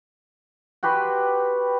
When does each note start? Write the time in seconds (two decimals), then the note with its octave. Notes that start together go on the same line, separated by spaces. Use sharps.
0.83 F#4 G4 B4 C6